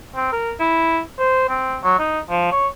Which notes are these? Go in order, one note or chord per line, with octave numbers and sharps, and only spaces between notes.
C4
A#4
E4
C5
C4
F#3
D#4
F3
C#5